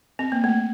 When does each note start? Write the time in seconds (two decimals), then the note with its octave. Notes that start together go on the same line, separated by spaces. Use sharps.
0.19 C4
0.32 A#3
0.44 A3